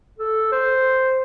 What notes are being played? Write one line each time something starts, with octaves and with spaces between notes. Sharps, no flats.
A4
C5